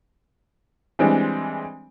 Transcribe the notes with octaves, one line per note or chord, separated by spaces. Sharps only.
E3 G3 G#3 C4 D4